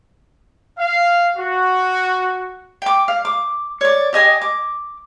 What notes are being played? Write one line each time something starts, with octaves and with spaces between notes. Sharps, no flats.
F5
F#4
G5 D6
F5
D6
C#5 D5
G4 D#5 G#5 D#6
D6